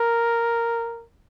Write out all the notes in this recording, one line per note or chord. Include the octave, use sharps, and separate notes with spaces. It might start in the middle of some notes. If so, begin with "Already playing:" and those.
Already playing: A#4